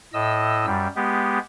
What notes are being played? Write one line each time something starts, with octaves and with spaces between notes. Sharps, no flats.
A2 D#5 E6
F#2 G3
G#3 B3 G4